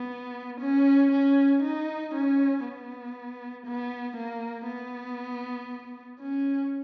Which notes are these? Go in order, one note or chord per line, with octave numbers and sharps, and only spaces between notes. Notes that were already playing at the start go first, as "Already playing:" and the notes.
Already playing: B3
C#4
C#4
D#4
C#4
B3
B3
A#3
B3
C#4